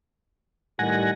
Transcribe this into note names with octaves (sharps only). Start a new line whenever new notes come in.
A2 D#3 G3 F#5 G#5 A#6